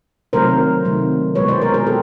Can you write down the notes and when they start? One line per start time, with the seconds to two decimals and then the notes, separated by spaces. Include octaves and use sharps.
0.33 C3 D#3 F#3 A3 A#4 C5
0.85 C3 D#3 F#3 A3
1.35 B2 G#3 B4 C#5
1.48 C5 D5
1.62 A#4 C5
1.74 G#4 A#4
1.86 B2 G4 A4